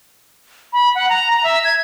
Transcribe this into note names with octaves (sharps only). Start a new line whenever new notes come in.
B5
F#5
A#5
A#5
E5
G#6